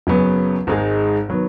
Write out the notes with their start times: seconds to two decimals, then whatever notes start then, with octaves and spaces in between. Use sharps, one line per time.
0.07 F#1 F#2 C#3 F#3 B3
0.67 G#1 G#2 G#3 D#4 G#4
1.29 D#3 F#3 B3